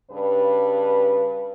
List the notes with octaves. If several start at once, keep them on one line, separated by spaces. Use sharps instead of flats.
G2 C#3 B4